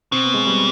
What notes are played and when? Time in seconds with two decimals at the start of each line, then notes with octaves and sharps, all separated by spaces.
0.12 B2 C4
0.23 B3
0.34 G#3
0.45 G3 B3